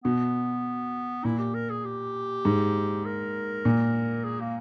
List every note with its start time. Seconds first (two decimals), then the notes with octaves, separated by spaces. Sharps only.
0.04 B2 B3
1.24 A#2 E4
1.39 G4
1.54 A#4
1.70 G#4
1.85 G4
2.45 G#2
3.05 A#4
3.65 A#2
4.24 G#4
4.40 A#3